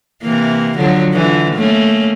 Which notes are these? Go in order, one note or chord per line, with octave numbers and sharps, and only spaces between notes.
C3 E3 A#3
D3 F3 F#3
D3 E3 F3
A3 A#3 C#4